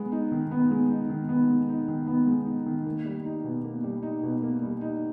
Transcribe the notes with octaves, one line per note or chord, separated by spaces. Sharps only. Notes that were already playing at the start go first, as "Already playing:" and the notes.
Already playing: G#3 B3
D#4
D#3
B3
G#3
D#4
D#3
B3
G#3
D#4
D#3
B3
G#3
D#4
D#3
A#3
G3
D#4
B2
A#3
G3
D#4
B2
A#3
G3
D#4